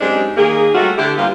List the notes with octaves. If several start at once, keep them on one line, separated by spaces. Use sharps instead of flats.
F#2 G#3 C4 D4 D#4 G4
D#3 A#3 G#4
F#3 G3 A3 F4 F#4
D3 E4 G4
F#3 G3 A#3 B3 F4